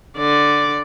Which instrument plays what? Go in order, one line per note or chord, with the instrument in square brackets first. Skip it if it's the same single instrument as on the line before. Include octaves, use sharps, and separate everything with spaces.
[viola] D3 D5